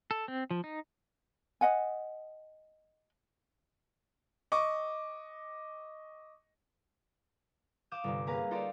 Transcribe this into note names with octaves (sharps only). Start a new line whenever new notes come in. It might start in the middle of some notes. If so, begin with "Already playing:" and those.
A4
C4
F3
D#4
D#5 F#5 G#5
D#5 C#6 D6
F5 D6 D#6 F6 G6 E7
G1 C3
A#3 C#4 G#4 B4 F5 A#5
D#4 F4 A4 C5 D5 F5